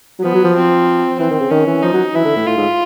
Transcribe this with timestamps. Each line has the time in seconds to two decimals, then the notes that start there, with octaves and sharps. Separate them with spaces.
0.19 F#3
0.23 F3 B3
0.34 F#3
0.44 F3
0.56 C4
1.19 E3 C4
1.30 D#3
1.41 C#3
1.50 D#3 C#4
1.67 E3
1.83 F3 D#4
1.93 F#3
2.14 E3 E4
2.25 D3
2.36 A2
2.47 A2 F4
2.57 G#2